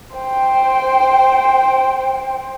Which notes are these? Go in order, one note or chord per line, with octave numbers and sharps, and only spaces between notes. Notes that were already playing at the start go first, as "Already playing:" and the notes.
C5 G5